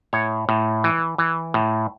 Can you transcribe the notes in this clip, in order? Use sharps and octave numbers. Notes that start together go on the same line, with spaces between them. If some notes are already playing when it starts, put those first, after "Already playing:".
A2 C#5
A2
E3
E3
A2